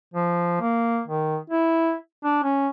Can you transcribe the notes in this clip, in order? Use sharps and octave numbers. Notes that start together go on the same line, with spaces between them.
F3
A#3
D#3
E4
D4
C#4